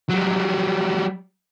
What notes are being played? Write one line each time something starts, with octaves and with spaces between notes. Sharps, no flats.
F#3 G3